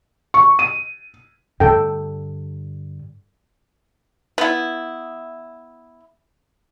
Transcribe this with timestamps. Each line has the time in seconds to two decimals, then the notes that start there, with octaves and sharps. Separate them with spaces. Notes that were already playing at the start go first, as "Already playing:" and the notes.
0.34 C#6
0.59 D#7
1.60 G2 D3 A4 G5
4.38 B3 E4